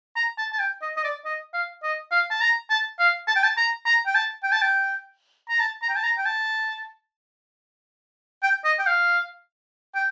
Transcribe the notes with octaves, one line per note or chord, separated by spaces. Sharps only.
A#5
A5
A5
G5
D#5
D#5
D5
D#5
F5
D#5
F5
A5
A#5
A5
F5
A5
G5
A5
A#5
A#5
G5
A5
G5
A5
G5
A#5
A5
A#5
G5
A5
A#5
G5
A5
G5
D#5
G5
F5
G5